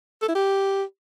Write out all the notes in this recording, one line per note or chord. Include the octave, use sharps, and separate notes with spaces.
A4
E4
G4